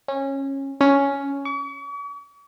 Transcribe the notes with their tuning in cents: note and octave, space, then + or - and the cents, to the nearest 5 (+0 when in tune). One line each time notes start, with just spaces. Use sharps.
C#4 -20
C#4 +5
C#6 +45